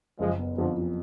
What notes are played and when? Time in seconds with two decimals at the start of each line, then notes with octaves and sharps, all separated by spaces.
0.19 F#1 F3 G#3
0.39 B3
0.58 F2 D3 F3
0.77 F3